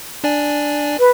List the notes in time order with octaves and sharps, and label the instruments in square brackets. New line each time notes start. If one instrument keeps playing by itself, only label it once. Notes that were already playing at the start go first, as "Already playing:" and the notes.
[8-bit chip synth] D4 D5 G#5
[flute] B4